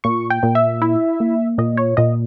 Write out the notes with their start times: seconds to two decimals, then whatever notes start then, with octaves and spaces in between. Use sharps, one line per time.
0.04 A#2 C#6
0.30 G5
0.43 A#2
0.55 E5
0.82 E4
1.20 A#3
1.58 A#2 D#5
1.77 C#5
1.97 A#2 D#5